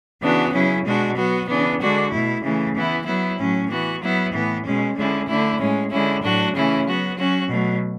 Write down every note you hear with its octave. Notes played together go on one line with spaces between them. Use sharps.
C#3 E3 B3 D4 F#4
C#3 F#3 C#4 E4
B2 G#3 D4 F#4
F#3 B3 F#4
C#3 E3 B3 D4
D3 G#3 D4 F#4
B2 A3 E4
C#3 E3 A3
E3 B3 E4
F#3 B3 E4
A2 F#3 C#4
E3 B3 F#4
F#3 B3 E4
A2 E3 B3
B2 G#3 C#4
D3 G#3 C#4 E4
D3 A3 E4
A2 G#3 C#4
D3 G#3 C#4 E4
A2 F#3 A3 D4 F#4
C#3 E3 A3 C#4 E4
F#3 B3 F#4
F#3 C#4 F#4
B2 F#3 A3